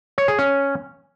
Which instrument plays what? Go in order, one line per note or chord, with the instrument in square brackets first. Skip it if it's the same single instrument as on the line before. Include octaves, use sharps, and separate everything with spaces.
[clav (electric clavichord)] C#5
G#4
C#4